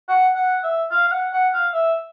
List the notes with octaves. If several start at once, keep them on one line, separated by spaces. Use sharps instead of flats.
F#5
F#5
E5
F5
F5
F#5
F#5
F5
E5